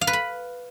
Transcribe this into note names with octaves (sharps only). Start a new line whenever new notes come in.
F5
B4
B5